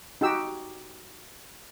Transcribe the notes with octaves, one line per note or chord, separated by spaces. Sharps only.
D#4 F#4 G4 E6